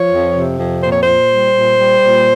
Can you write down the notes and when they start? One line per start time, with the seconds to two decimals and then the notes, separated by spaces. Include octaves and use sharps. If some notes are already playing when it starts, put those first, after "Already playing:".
Already playing: F3 C#5
0.10 F2
0.34 C3
0.58 F2
0.82 A#2 C5
0.91 C#5
1.02 A#2 C5
1.30 G3
1.54 A#2
1.78 G3
2.01 A#2